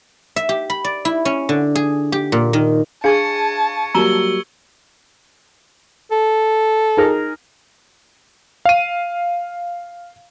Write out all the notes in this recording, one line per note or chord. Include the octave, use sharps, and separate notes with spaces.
E5
G4
B5
D5
E4
C#4
D3
G#4
G4
A#2
D#3
D4 G#4 F5 G#5 A5 C#6 G#6 C#7
F#3 G3 A#3 A#5 C#6 E6 G7
A4
D#4 G#4 A#4
F5 D#7